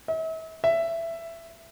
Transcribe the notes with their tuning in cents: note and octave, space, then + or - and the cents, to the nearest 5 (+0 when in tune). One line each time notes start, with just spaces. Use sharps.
E5 -40
E5 +15